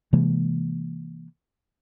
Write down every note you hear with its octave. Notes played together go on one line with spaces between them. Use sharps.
C3 E3 G#3 A#3